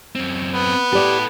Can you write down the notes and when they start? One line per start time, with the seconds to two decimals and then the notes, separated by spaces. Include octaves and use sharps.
0.15 F#2 C4
0.54 B3
0.93 E4 G4 A4 D5